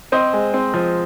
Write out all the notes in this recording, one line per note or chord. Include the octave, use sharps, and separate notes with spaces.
C4 C5 D#5
G#3
C4
F3